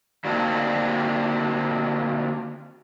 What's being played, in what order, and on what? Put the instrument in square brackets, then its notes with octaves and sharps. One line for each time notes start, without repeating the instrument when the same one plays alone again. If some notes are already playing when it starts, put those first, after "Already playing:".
[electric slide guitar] D3 F#3 A#3 C4 D4 D#4